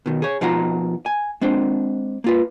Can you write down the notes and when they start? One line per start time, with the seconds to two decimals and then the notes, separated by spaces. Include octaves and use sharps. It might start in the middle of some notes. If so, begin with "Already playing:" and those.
0.06 B2 D#3
0.22 G#4 C#5
0.41 B2 F3 D#4 F4 F#5 A#5
1.06 G#5
1.41 G#3 C4 D4 C5
2.24 A#3 F4 B4